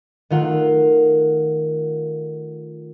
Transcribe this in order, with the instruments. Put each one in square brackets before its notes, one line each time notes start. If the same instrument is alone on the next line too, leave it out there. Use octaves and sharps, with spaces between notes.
[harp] D#3 A3 F4 A#4 F#5